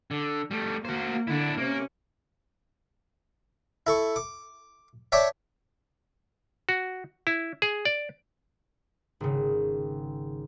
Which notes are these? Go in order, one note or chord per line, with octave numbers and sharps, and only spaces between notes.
D3
G3 A3
A#3 F#4 C5
D3 D4 E4
C3 A#3 C#4
E4 A4 C#6
D6
C#5 D5 E5 G5 A5 D6
F#4
E4
G#4
D5
G#1 C#3